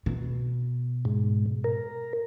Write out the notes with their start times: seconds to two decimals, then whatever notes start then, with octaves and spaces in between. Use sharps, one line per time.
0.06 B2
1.05 G#2
1.64 A#4